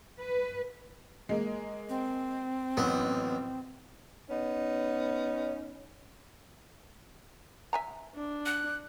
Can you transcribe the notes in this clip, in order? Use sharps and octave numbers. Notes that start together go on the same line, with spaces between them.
B4
G#3 A#3
C4
A1 F#3 B3
B3 C#4 D#4
E5 G#5 A#5
D4
F#6